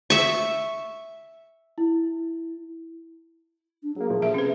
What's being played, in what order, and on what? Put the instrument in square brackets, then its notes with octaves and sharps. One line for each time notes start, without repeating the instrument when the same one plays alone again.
[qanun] E5 C#6
[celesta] E4
[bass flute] D4
[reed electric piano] F#3 A#3 [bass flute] G#4
[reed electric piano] A#2 F3 A3
[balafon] E5
[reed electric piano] C3 [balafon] C#4 B4